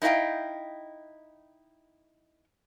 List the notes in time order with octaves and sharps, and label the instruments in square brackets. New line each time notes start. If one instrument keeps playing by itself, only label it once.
[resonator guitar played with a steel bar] D#4 E4 D#5 F5 G5